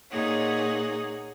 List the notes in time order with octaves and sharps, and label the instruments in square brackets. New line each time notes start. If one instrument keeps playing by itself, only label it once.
[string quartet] A#2 D#4 G#4 C#5 F#5